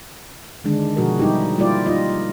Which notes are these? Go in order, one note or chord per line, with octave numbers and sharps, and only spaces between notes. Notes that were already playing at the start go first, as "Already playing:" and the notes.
D3 D#3 G#3 D4
B2 F3 F#4 G#4 A#4
G3 D#4 E4 G4
G3 A#3 E4 F4 G4 D5
D#4 F4 D#5